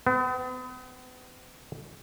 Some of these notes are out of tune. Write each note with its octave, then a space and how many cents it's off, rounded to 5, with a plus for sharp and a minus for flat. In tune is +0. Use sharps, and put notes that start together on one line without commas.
B3 +40